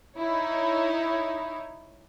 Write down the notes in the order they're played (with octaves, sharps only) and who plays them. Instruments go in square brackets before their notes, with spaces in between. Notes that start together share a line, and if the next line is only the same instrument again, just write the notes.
[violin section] D#4 E4 C#5